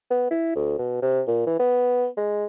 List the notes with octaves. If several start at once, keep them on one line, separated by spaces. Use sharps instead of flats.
B3
E4
D2
B2
C3
A#2
E3
B3
G#3